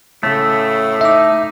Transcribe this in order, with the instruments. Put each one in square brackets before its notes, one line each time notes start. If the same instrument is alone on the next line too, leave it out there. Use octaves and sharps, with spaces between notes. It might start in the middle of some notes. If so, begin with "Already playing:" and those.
[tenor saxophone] A2 [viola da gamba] C#3 [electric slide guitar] A3
[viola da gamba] D#4 [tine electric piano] E5 D6